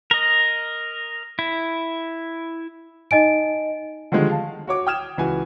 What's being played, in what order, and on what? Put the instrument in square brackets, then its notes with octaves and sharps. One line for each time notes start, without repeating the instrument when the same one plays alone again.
[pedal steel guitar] A#4 D#5
E4
[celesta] D#4 D#5 G#5 D7
[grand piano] D3 D#3 F3 G3 G#3
F5 A5
F#4 C#5 D6
G5 D#6 F6 G#6 E7
C#2 E3 F#4 G#5